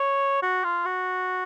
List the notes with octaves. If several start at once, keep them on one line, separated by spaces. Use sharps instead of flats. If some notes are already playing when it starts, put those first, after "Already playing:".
Already playing: C#5
F#4
F4
F#4